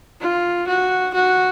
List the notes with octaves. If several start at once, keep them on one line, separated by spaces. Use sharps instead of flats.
F4
F#4
F#4